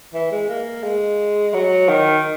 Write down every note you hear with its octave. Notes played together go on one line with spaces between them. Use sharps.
E3
G#3
A#3
G#3
F#3
D#3